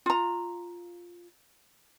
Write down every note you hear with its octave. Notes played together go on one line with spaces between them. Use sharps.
F4 A#5